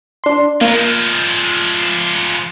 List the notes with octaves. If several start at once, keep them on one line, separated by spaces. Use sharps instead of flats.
D4 C6
F3 G#3 A#3